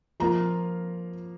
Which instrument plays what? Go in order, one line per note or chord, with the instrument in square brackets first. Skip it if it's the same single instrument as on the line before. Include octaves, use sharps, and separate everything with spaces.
[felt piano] F3 A#3 F4 A#5